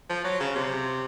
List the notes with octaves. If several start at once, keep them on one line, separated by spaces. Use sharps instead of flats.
F3
F#3
C#3
C3